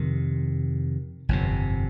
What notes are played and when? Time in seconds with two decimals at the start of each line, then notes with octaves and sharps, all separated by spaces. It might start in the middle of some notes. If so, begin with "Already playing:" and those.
Already playing: F2 C3 D#3
1.29 G1 F2 C3